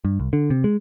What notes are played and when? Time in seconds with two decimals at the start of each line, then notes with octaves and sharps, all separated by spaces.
0.05 G2
0.20 C2
0.33 D3
0.50 C3
0.64 G#3